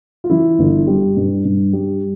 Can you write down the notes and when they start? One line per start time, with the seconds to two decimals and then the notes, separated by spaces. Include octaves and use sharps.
0.24 F4
0.30 E3 E4
0.59 G1
0.87 G3
1.17 G2
1.45 G2
1.73 G3